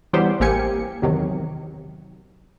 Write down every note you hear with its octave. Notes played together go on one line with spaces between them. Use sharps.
E3 F#3 G3 B3 G4 C5
A1 A#3 C4 G4 G#5 C#7
E2 C3 D#3 F#3